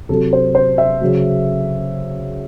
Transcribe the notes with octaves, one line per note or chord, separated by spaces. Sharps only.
C3 F#3 A4
C5
C5
E5
C#3 F#3